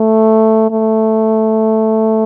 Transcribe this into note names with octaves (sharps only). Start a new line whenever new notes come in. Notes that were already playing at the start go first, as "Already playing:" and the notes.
Already playing: A3
A3